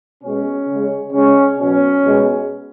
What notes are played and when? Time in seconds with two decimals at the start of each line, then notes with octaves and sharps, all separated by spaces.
0.24 B2 G#3 C#4
0.68 C#3 G#3
1.13 C#3 G#3 C#4
1.58 B2 F#3 C#4
2.03 B2 G#3